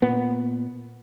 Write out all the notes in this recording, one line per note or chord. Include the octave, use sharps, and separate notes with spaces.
A#2 B3